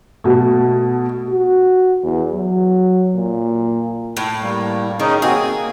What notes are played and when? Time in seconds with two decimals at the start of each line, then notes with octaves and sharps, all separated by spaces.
0.24 B2 A3
1.29 F#4
2.03 E2
2.33 F#3
3.16 A#2
4.17 A2
4.42 G3 A#3
5.00 D#3 C#4 D#4 G#4
5.22 A#3 C4 F#4 G#4
5.35 A#3